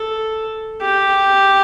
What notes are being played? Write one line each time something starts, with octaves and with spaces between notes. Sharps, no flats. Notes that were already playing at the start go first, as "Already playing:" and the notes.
Already playing: A4
G4